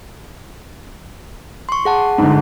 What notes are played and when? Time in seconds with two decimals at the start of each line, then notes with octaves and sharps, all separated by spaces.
1.69 C6 C#6
1.85 G#4 F#5 A5
2.18 G1 G#2